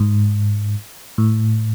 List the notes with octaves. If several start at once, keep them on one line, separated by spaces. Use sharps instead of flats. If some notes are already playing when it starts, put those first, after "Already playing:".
Already playing: G#2
A2